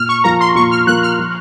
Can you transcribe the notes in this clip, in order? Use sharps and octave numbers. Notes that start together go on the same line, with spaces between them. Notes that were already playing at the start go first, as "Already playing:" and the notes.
Already playing: A#2 F6
C#6
F3 A#3 A#5
C6
A#2 C#6
F6
F3 A#3 F#6
F6
F3